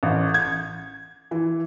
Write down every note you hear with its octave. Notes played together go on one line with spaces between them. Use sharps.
A1
G#6
E3